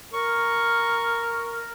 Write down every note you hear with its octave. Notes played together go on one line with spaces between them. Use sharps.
A#4 C#6